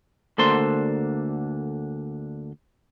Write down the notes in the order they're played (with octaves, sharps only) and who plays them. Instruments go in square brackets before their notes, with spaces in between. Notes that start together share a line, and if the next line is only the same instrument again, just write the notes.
[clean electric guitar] D2 D3 A#3 A4 C5 C6